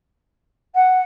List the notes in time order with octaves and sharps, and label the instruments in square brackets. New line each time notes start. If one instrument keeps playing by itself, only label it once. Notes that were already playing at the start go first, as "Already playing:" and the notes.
[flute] F#5